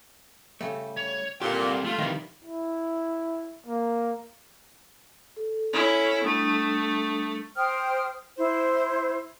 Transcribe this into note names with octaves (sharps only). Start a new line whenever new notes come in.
C#3 G3 A3
C#5
C2 A#2 G4 A4 F#5 C6
A3 F4
C3 D#3 E3 G3
E4
A#3
A4
C#4 E4
G3 A3 D4 D#6
C5 G5 D#6 F6
E4 C5